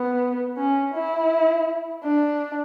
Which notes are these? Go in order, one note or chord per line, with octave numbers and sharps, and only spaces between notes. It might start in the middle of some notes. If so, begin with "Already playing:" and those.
Already playing: B3
C#4
E4
D4